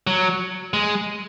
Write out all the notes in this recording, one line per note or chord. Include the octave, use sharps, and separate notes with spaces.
F#3
G#3